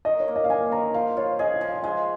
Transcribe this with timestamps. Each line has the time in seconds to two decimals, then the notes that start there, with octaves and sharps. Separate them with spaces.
0.05 D#3 D#5
0.20 C#5
0.28 A#3
0.36 D#5
0.44 F5
0.50 A#3 G#5
0.72 D#3 A#5
0.94 F3 F5
1.17 F4 C#5
1.39 G#4 D#5
1.54 F5
1.61 F3
1.69 F5
1.83 G#3 G#5